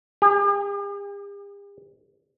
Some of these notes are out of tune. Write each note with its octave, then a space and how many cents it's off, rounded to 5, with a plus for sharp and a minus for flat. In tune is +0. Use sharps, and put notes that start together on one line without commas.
G4 +45